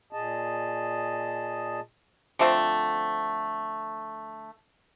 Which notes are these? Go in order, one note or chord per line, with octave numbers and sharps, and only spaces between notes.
A#2 G#4 D#5 A5
D3 F3 A3 C4